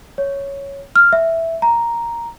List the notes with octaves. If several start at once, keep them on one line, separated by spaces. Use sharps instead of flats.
C#5
F6
E5
A#5